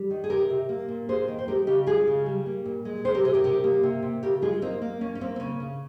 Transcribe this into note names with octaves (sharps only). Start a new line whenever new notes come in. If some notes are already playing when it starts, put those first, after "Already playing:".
Already playing: G3
D#3
G#4
C3 G4 A#4
C3
A#3
A#2
A#3 G#4 C5
D#3
C5
G#3 G4 A#4
C#3 D#4 G4
G#3 F4 G#4
C#3
G3
A#3
A#2
G#3
C3 G#4 C5
G4 A#4
C3 G#4 C5
G4 A#4
C3 G4 A#4
A#3
C3
C3
C#3 G4 A#4
G#3 F4 G#4
A#3 C4 D#4
A#3
A#3 C#4
C#4
A#3 C4
C4
C#3 C#4
C#3